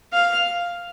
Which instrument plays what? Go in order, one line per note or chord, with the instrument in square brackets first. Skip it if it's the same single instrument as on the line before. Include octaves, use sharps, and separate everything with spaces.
[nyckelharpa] F5